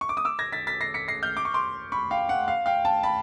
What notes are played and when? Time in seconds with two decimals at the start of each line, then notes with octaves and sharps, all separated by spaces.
0.01 C#6
0.09 D6
0.17 D#6
0.25 D6 E6
0.39 G#6 A#6
0.52 A6 B6
0.67 A6 B6
0.81 A#6 C7
0.94 B6 C#7
1.08 A#6 C7
1.23 F6 G6
1.37 D6
1.45 C#6
1.54 C6 D6
1.92 B5 C#6
2.11 F5 G5
2.29 F#5
2.48 F5
2.66 F5 G5
2.85 G5 A5
3.03 A5 B5